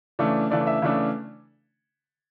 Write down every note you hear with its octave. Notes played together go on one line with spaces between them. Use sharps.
C#3 E3 A3 D4
C#3 E3 A3 D4 D5
E5
C#3 E3 A3 D4